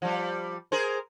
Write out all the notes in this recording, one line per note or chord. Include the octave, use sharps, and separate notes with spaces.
F3 G3
G#4 A#4 C5